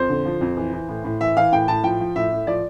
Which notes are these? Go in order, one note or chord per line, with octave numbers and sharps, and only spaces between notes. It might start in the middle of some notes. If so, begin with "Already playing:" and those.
Already playing: F2 C5
D3
F3
F2
E3
E3
A2
A2
E3 E5
E3 F5
A2 G5
A2 A5
F3 G5
F3
A2 E5
A2
F3 D5